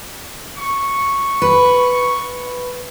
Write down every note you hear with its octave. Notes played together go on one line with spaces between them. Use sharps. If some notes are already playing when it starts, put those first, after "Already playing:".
C#6
B4